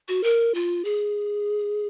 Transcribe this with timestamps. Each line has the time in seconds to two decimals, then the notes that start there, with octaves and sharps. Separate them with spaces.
0.08 F#4
0.24 A#4
0.55 F4
0.85 G#4